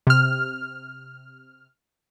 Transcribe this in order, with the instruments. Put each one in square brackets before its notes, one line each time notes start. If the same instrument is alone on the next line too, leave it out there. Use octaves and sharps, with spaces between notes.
[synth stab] C3 F6